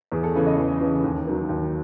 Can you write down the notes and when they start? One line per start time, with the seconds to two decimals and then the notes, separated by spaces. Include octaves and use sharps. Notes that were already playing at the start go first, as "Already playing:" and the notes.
0.12 E2 G#4
0.24 A4
0.35 C#3 E3 B4
0.46 D#5
0.58 E2
0.81 C#3 E3
1.04 D#2
1.27 D#3 F#3
1.49 D#2